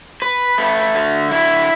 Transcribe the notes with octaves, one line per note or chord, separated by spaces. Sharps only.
B4
A3
D3
E4